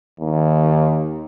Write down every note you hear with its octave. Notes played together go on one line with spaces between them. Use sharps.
D#2